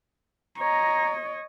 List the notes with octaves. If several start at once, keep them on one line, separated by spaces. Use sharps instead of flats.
C#5 D#5 A#5